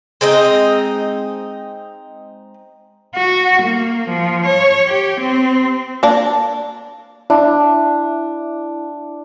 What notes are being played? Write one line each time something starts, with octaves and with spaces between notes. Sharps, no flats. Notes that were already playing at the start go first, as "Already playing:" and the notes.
G#3 C4 D#4 D#5
F#4
A#3
F3
C#5
G4
C4
A#3 D4
D4 E4